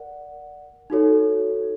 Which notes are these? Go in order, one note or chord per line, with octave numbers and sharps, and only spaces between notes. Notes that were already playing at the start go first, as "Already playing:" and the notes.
Already playing: A#4 D5 F#5
D#4 F#4 A4 C#5